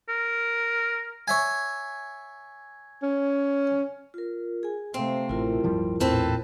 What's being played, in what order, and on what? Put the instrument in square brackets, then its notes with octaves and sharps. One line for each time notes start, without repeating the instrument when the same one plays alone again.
[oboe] A#4
[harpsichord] C#5 E5 G#5
[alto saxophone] C#4
[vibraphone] F4 A#4
G#4 G#5
[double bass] C3 A3 [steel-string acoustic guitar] C4 [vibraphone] C5 F5
[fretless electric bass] A1 [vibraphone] E4 F4 A#4
[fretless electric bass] D1 F3 G3 [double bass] G1
[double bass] A#1 [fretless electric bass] E2 A2 [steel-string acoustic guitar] C4 A4 B4